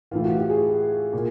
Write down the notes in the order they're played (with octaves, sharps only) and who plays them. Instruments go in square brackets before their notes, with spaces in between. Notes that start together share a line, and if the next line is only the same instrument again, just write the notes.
[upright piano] A2 E3 F4
F#4
G4
G#4
A#2